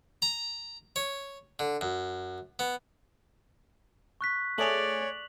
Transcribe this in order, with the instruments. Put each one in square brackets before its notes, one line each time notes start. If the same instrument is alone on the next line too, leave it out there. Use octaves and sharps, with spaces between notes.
[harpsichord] A#5
C#5
D3
F#2
B3
[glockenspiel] C#6 F#6 B6
[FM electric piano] A3 G#4 [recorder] C#5 [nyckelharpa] D5 [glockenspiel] F7 F#7